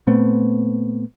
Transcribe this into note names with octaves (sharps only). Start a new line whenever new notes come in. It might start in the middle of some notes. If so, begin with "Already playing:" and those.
A#2 A3 B3 C4